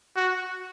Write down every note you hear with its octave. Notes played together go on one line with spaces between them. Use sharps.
F#4